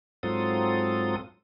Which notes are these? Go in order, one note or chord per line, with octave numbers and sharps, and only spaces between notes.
G#2 F#3 C4 F4 A4 D#6